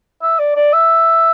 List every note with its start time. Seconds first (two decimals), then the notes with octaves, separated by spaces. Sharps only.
0.23 E5
0.39 D5
0.56 D5
0.73 E5